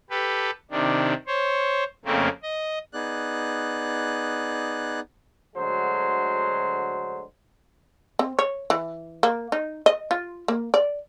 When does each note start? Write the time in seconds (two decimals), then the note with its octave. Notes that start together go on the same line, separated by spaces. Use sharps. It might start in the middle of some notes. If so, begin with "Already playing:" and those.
0.10 G4 A4 B4
0.71 C3 D#3 D4
1.27 C5 C#5
2.05 F2 C#3 A3 A#3 C4
2.43 D#5
2.93 B3 D#4 G#4 D5 F#6
5.56 D2 D3 F#3 G#3 C5
8.19 C4
8.39 C#5
8.70 E3
9.23 A#3
9.52 D#4
9.86 D#5
10.11 F4
10.48 A#3
10.74 D5